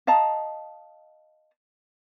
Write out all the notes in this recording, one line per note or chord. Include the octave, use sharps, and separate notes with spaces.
D#5 F5 A5 A#5